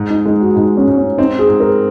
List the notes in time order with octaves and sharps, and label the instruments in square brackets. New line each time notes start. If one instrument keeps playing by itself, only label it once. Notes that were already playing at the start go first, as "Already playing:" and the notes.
Already playing: [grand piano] G#2
[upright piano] D#4
[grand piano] G#3 [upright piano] D#4
[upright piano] F#4
[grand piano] G#2 [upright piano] D#4
[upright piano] C#4
[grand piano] G#2
[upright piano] C#4
[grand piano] C4 [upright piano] D#4
[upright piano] G#4
[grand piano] G#2
[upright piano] A#4